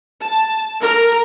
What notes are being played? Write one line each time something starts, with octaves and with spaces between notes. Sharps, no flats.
A5
A#4